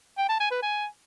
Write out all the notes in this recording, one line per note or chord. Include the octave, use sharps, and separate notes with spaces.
G5
A5
G#5
B4
G#5